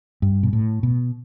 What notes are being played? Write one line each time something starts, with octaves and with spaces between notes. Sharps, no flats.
G2
B2
A2
B2